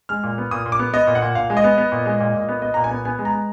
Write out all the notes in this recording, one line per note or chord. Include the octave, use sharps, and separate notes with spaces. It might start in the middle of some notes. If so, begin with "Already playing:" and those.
G#3 F6
A#2
B3
A#2 D#6
A#2
D6
B3
B3 D#5
A#2
F#5
A#2
A#2 F5
G#3
D#5
B3
B3
A#2
G#3
A#2
A#2
B3
B3 D#5
A#2 A#5
G#5
B3
B3 G#5
G#3
A#5
G#3